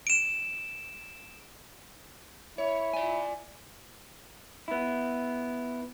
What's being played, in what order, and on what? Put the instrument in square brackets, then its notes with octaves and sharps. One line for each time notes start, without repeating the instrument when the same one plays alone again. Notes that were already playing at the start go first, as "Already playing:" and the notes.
[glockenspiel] D7 E7
[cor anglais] E4 [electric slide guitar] C#5
[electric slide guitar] D5 G#5
[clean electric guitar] B3 E4